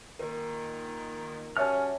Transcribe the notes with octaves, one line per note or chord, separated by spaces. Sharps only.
A#2 D#3 A#4
G3 C#4 F#4 C#5 E5 G#5 A5 F6